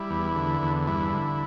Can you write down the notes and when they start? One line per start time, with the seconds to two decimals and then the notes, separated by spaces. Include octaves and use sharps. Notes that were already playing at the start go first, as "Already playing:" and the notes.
Already playing: G3 E4
0.10 E2
0.35 D3
0.62 E2
0.87 G2 E4
1.13 D3